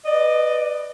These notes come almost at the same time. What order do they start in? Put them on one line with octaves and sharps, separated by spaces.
D#5 D5 B4